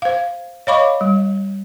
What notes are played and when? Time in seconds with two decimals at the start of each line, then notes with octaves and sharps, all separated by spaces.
0.02 C5 F5
0.67 C#5 D#5 F5 B5 C#6 D6
1.01 G3